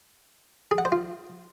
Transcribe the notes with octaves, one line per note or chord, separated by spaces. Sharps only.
G#4
F#5
C5
F4